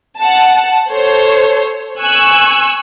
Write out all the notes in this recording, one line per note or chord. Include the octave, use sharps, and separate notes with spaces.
F#5 A5
A4 C5 C#5
G#5 C#6 E6 F#6